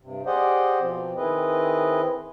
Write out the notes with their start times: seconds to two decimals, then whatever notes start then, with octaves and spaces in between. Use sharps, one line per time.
0.02 G2 C3
0.26 G4 G#4 C5 D5 D#5 F#5
0.80 B2 F3 C4
1.16 D#3 C4 E4 G#4 B4 D#5